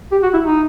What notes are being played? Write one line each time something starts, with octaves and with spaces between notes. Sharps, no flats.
G4
F#4
E4
D#4